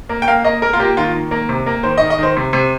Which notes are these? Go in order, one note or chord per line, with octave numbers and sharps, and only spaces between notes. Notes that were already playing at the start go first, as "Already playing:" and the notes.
A#3
G5
A#3 F5
A#3 D#5
A#3 A#4
F4
A#3 G4
D#3 F4
D#3
A#3
C3
A#3
D#3 C5
D#3 D#5
D#5
D#3 C5
C3
C3